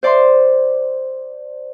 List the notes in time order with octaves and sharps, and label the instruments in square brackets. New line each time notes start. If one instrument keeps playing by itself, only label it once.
[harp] C5 D5 C6